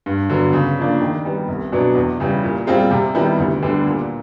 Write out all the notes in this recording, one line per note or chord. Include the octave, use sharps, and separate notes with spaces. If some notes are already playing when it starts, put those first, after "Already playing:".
G2
D3 F#3 B3
C#3
F3 A#3 D4
D#3
G3 B3
C2
B2 F#3 B3 D4
E2
C#3 E3 G3
A#2
G3 C4 F4 G#4
C3
D#3 G3 B3 E4
D2
D3 G3 B3 D4
A#2